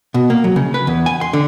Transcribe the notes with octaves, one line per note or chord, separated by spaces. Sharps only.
B2
A#3
F#3
C#3
B4
E2
G#5
C6
D3